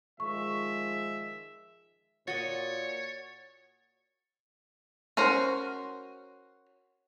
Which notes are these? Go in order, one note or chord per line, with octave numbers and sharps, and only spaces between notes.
D#3 F3 G#3 E5 C#6
A#2 F#4 C#5 D#5 A6 C#7
C#4 F#4 A#4 C5